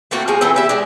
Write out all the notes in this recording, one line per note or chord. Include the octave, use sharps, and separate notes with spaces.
A3 A#3 C4 F#4
F3 G#3 G#4
E3 A3 B3 C4
G4 E5
G#3 D4